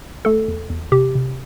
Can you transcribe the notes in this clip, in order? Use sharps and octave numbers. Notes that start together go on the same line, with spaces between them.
A3 A4
E2
E2
C3 G4
C3